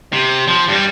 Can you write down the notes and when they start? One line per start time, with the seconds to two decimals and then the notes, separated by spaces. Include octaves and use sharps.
0.13 C3
0.48 F3
0.68 G2 G3